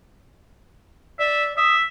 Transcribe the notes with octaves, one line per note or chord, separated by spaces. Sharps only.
D5 E5
E5 D#6